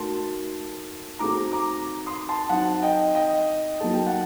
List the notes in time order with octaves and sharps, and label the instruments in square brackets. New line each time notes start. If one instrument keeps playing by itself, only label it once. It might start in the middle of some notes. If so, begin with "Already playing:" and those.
Already playing: [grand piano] A3 D#4 F#4 A#4 [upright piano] A5 C6
[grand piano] D#3 A3 C4 F#4 A4 [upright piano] A#5 D6
[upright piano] A#5 D6
C6 D#6
A5 C6
[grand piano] F#3 C4 D#4 [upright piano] F#5 A5
[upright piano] D#5 G5
D#5 G5
[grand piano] F#3 A#3 D#4 A4 [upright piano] A5
[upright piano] G5
F#5 A5